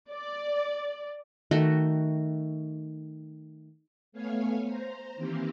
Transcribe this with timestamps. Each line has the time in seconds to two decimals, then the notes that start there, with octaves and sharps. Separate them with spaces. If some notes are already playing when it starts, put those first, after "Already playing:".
0.11 D5
1.51 D#3 A3 F#4 G5
4.12 A3 B3 C#5 F5 G#5
4.64 C5 A#5
5.16 D#3 E3 A#3 C4 G4